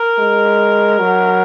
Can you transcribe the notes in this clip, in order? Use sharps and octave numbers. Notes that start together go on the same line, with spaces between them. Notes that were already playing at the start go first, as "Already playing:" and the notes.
Already playing: A#4
G#3
F#3